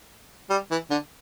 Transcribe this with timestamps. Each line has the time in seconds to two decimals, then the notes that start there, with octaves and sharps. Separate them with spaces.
0.50 G3
0.71 E3
0.91 D3